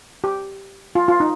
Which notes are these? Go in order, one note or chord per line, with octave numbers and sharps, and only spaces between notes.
G4
F4
F4
D#4